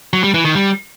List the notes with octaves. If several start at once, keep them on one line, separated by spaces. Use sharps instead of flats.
F#3
G3
E3
D#3
G3